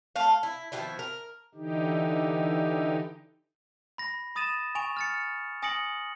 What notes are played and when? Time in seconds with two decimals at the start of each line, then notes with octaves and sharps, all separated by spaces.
0.16 A3 F5
0.43 E4
0.72 B2 D#3 F3 E4
0.99 A#4
1.55 D3 E3 D#4 G4
3.98 B5 A#6
4.35 B5 D#6 A6 D#7 E7
4.75 G#5 C#6 D7 F7
4.97 F6 A6 C#7
5.62 G#5 D#6 A#6 C#7 D7 F#7